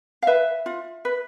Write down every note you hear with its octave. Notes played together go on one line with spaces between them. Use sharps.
F5
B4 E5
F4
B4